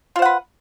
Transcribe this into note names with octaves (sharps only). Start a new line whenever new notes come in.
F4 B4 C5 F#5